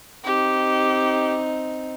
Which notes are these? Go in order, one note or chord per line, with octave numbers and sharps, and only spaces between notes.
C4 D#4 G4